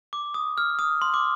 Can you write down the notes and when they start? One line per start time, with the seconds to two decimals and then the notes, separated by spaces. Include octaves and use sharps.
0.13 D6
0.34 D#6
0.58 F6
0.79 D#6
1.02 C6
1.14 D6